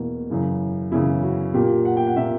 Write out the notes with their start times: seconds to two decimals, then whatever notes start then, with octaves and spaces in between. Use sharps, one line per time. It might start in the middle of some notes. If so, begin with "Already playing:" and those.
Already playing: E2 B2 A#3
0.30 F#2 C#3 E3
0.92 F#2 C#3 E3 E4
1.23 F#4
1.54 A#2 A#3 G4
1.85 F#5
1.97 G5
2.07 F#5
2.16 A#2 A#3 E5